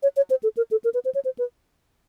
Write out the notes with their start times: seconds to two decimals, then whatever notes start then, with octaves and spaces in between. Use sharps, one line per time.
0.03 C#5
0.17 C#5
0.30 C5
0.43 A4
0.57 A#4
0.71 A4
0.84 A#4
0.94 B4
1.05 C5
1.15 C#5
1.25 C5
1.38 B4